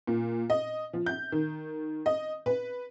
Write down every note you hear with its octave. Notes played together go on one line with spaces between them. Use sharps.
A#2
D#5
F3
G6
D#3
D#5
B4